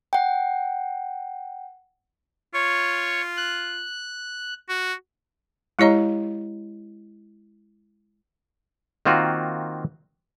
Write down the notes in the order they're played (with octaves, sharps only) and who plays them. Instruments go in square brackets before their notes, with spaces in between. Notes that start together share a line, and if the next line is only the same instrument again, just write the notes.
[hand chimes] F#5 G5
[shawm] F4 [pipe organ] C#5
[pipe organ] F#6
[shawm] F#4
[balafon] G#3 E4 G4 C#5 D#5 A#5
[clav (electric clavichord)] D#3 A#3 C4 F4 F#4